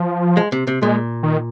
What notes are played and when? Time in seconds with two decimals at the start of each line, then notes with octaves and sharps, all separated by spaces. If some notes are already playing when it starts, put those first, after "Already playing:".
Already playing: F3
0.37 G#3
0.52 C3
0.67 C3
0.82 A#2 G#3
1.23 D#3